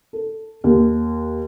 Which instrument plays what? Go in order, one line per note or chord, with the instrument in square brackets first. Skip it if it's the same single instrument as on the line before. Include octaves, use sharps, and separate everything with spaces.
[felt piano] A4
D#2